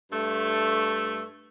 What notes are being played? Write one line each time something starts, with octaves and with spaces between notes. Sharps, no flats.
G2 A3